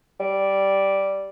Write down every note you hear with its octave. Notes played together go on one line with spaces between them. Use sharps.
G3